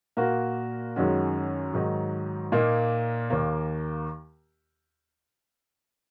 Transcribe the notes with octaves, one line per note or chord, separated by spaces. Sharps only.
A#2 A#3 F#4 A#4
F#2 D#3 G#3 C#4 F#4
G#2 D#3 F#3 D#4
A#2 A#3 D#4 A#4
D#2 D#3 A#3